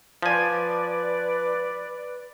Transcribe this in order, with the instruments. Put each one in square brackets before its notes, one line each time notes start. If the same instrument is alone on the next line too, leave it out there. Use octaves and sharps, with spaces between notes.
[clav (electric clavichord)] F3 G#5 [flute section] B4 D5